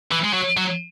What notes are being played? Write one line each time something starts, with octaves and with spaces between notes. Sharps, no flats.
E3
G#3
F#3
F#3